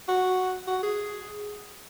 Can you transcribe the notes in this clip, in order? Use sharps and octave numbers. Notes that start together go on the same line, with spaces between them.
F#4
F#4
G#4